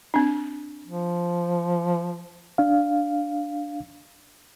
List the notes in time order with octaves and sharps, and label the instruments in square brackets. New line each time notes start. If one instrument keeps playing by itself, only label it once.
[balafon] C4 D4
[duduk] F3
[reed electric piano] D4 F5